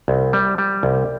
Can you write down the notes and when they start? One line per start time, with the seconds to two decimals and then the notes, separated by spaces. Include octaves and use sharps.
0.08 C2
0.33 G3
0.58 G3
0.83 C2